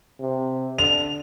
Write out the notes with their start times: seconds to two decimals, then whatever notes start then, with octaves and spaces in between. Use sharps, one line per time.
0.20 C3
0.78 D3 F7